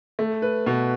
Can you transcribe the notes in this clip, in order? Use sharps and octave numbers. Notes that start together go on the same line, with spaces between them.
A3
B4
B2